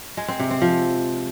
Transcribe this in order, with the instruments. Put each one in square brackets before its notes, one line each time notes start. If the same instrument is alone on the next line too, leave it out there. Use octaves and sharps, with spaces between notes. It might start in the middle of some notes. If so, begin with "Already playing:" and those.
[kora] G#3
C4
C3
C4
F3